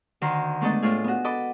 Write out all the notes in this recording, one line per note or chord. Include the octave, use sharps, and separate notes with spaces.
D2 D#3 D#4 A#5 C6
G#3 A3 B3 D4 A4 D#5
A2 F4 G#4
B3 F#4
A4 D#5 B5 D6